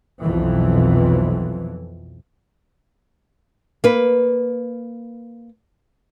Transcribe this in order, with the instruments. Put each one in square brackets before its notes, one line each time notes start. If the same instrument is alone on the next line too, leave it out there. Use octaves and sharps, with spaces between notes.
[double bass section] B1 F2 B2 E3
[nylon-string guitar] A#3 B4